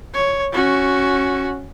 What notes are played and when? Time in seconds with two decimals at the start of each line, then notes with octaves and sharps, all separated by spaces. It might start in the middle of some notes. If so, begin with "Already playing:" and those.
0.14 C#5
0.52 C#4 F#4